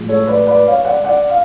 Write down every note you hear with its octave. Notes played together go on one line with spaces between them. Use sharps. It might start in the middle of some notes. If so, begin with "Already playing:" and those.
Already playing: A2 F3 G#3
A4 C#5
B4 D5
B4 D5
C#5 F5
D5 F#5
D5 F#5
F5